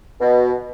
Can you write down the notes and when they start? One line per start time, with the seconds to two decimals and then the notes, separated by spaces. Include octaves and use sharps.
0.20 B2